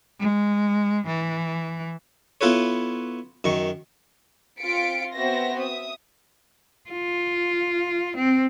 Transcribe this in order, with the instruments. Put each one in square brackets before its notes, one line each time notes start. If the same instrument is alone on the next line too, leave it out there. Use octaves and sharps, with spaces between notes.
[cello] G#3
E3
[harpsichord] B3 E4 F4 A4 B4 C#5
F#2 D#3 C#6
[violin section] C4 F4 B6 C#7 D7
B3 C4 F#4 C5 E5 A#6
E5 D#6
[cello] F4
C4